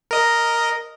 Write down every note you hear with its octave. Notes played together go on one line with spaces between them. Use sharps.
A#4 D#5 D#6